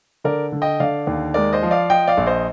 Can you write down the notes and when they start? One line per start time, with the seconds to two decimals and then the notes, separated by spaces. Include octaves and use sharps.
0.24 D3 A#4 D5
0.52 D3
0.62 D#5 G5
0.80 D3 D5 F5
1.07 D#2
1.34 G#3 A#4 D5
1.53 C5 D#5
1.63 F3
1.71 D5 F5
1.90 F3 D#5 G5
2.08 D5 F5
2.17 A#1
2.26 C5 D#5